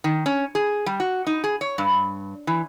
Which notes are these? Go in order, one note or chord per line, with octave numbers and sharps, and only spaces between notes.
D#3
C#4
G#4
G3
F#4
D#4
G#4
C#5
G2
E3